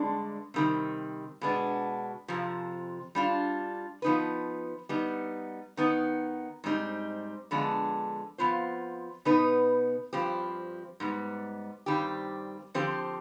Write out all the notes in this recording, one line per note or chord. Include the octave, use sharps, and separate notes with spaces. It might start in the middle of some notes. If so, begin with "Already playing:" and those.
Already playing: G2 D3 G#3 D4
C3 D#3 G3 C4
B2 G#3 B3 D4
F2 C3 F3
G3 D4 F4
F3 B3 D#4 B4
G3 B3 D#4
D#3 B3 D#4
G#2 G3 C4 D#4
D3 F3 G#3 B3 D4
F2 D#3 B3 F4 C5
B2 B3 D#4 B4
G2 F3 C4 G4
G#2 G3 B3
G2 D#3 G3 C4 G4
D3 F3 C4 G4 C5